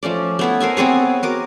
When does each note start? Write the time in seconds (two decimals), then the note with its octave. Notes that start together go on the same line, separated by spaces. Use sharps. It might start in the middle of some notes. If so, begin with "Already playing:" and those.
0.03 F3 A3 C#4 D5
0.39 A3 B3 E4
0.60 A#4 C5 E5 G#5
0.77 B3 C4 G#4 C#5
1.23 F#4 A#4 D6